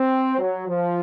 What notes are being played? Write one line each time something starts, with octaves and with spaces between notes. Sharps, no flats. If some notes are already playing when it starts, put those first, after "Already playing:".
Already playing: C4
F#3
F3